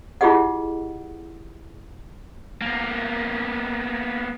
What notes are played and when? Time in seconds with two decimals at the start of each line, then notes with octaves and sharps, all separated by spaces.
0.21 E4 F4 G4 G#4 D#5 F#5
2.62 A#3 B3